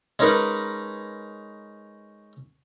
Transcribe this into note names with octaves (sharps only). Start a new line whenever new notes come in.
G#3 C#4 D#4 A#4 B4